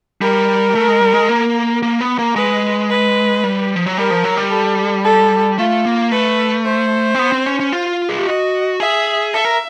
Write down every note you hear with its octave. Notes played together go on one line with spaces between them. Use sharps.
G3 A#4
A3
G#3
G3
G#3
A#3
A#3
B3
A#3
G#3 B4
B4
G3
F3
F#3
G3 A#4
F3
F#3
G3
A4
A4
A3 F4
A#3
A3 B4
C5
C4
B3
C4
C#4
C#4
F4
G#4
G4
F#4 D#5
G#4 E5
A4 E5
A#4